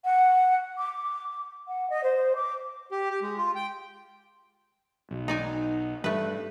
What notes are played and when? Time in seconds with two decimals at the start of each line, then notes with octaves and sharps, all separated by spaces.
0.04 F#5
0.77 D6
1.67 F#5
1.89 D#5
2.03 C5
2.35 D6
2.91 G4
3.10 G4
3.22 G#3
3.38 F4
3.55 G5
5.11 B1
5.28 D#4 D5 G#5
6.04 G2 A3 B4